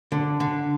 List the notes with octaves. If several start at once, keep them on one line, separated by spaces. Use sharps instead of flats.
D3
D3